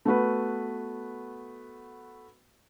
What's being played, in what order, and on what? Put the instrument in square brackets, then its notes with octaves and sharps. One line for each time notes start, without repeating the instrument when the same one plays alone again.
[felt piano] A3 B3 F#4 B4